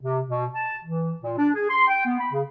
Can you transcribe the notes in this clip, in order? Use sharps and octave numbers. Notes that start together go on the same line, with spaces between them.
C3
B2
A5
E3
A#2
D4
G#4
C6
G5
B3
B5
C#3